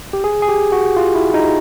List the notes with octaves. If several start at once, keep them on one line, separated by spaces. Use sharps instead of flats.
G4
G#4
G#4
G4
F#4
F4
E4
D#4